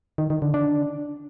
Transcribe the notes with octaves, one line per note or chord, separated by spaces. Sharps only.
D#3
D#3
D3
D4